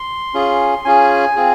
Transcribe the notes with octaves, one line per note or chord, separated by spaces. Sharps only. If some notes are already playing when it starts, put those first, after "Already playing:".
Already playing: C6
C#4 F4 G#4
C#4 F4 G#4 G#5
C4 F4 G#4